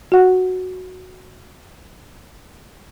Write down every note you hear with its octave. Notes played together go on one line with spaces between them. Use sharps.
F#4 F#5